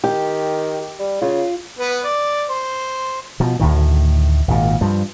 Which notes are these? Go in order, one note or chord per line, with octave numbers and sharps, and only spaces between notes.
D#3 G4
G3
C#3 F4
B3 B4
D5
C5
B2 F3
D2 A2 D#3
G#1 A#2
G2 F3